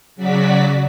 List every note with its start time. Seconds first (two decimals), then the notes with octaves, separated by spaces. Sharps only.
0.16 C#3 F#3 F#4 D5 B6